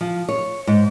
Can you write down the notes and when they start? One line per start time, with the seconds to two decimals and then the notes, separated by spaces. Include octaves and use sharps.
0.01 F3
0.29 C#5
0.67 G#2